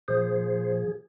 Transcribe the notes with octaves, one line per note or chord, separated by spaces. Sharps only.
A#2 F3 G#4 C5